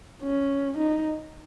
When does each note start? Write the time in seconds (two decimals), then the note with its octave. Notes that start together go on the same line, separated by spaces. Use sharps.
0.23 C#4
0.78 D#4